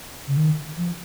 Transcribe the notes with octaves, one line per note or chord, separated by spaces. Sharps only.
C#3
D#3
F3